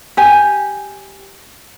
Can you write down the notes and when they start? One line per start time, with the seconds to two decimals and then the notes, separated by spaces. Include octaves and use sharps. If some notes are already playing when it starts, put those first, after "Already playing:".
0.17 G4 G#5